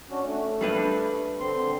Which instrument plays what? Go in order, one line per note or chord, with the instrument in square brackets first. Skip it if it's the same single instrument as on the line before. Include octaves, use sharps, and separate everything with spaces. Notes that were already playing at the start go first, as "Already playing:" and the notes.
[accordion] C#4 D4 F#4
A3
[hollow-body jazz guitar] G3 D4 B4
[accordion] D3 C4 C6